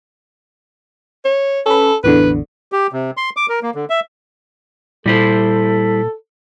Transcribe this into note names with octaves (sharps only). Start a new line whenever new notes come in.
C#5
C#4 A4 B4
A1 E2 D3 B4
G4
C3
C6
D6
A#4
A#3
D3
E5
A#2 G3 E4 A4 C5